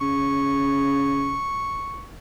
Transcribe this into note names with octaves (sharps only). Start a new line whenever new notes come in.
C#3 C#6